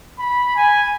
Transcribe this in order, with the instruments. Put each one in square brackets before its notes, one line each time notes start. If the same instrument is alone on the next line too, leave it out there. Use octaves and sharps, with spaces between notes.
[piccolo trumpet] B5
G#5